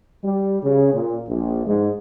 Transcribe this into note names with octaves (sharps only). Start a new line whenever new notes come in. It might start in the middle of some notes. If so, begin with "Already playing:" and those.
G3
C#3
A#2
A#1
G#2